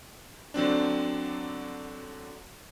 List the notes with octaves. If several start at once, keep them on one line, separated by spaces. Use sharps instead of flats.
D3 F#3 C4 D4